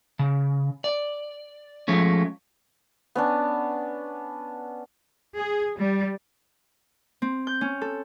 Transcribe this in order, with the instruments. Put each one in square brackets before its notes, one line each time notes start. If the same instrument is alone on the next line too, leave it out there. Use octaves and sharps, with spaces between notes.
[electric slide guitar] C#3
D5
F3 G#3 A3 C#4
[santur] B3 C#4 D4
[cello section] G#4
G3
[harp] C4
G6
C#4
A4